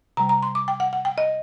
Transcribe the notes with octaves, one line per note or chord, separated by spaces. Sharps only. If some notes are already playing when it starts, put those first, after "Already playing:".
C3 G3 A#5
A#5
C6
D6
G5
F#5
F#5
G5
D#5